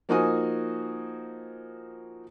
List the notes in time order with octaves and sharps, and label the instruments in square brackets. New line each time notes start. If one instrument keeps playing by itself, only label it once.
[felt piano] F3 A#3 D#4 F#4 G#5 D#6